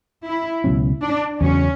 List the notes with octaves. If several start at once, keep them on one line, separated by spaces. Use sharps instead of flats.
E4
C#2 B2 F#3 C#4
D4
E2 C#3 F#3 C#4